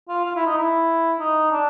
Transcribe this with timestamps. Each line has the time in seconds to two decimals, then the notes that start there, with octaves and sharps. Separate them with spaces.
0.08 F4
0.25 F4
0.35 E4
0.46 D#4
0.57 E4
1.19 D#4
1.51 D4